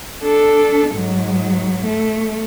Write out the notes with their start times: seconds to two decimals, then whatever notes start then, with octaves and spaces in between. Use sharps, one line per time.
0.23 D4 A4
0.91 G#2 F#3
1.85 A3